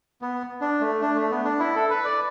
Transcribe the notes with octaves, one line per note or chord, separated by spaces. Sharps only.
B3
D4
A3
D4
A3
B3
D4
E4
A4
B4
D5